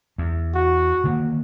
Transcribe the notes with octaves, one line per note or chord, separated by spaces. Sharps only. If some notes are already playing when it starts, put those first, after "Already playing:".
E2
F#4
D3 D#3 A#3